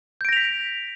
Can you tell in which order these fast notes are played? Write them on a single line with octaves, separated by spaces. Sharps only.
G6 D7 A#6 F7 B6